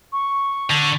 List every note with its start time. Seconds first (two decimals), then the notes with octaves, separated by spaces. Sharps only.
0.13 C#6
0.70 D3